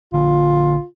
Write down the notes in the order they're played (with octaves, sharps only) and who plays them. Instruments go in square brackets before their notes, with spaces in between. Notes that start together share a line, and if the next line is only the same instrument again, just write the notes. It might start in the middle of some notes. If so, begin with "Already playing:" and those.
[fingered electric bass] A#1 D3 [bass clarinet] F4